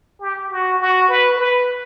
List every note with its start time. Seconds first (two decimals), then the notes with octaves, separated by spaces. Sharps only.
0.21 G4
0.50 F#4
0.80 F#4
1.09 B4
1.38 B4